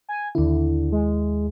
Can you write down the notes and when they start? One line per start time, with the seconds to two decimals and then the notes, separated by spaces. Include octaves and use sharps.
0.09 G#5
0.35 D#2 D3 E4
0.92 G#3